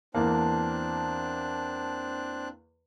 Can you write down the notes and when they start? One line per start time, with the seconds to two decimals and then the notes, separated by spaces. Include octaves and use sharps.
0.15 E2 A#3 C4 D4 A5 F#6